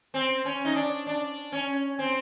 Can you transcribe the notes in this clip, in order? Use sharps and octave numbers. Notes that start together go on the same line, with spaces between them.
C4
C#4
D#4
D4
D4
C#4
C4